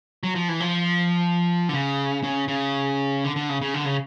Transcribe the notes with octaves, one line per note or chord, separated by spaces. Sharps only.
F#3
F3
E3
F3
D3
C#3
C#3
C#3
D3
D3
C#3
C#3
D3
C#3